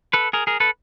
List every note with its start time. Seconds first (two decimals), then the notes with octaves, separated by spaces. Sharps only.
0.13 A4 B4
0.33 G#4 A#4
0.47 G#4 A#4
0.60 A4 B4